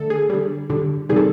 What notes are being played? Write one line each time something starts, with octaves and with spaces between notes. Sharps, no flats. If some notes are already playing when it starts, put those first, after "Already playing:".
Already playing: D3 A3 A4
G#4
D3 G3
D3 G3
C3 D#3 G3 G#4
A4